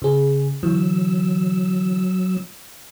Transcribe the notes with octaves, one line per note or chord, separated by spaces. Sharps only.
C#3 G#4
D3 E3 F#3 E6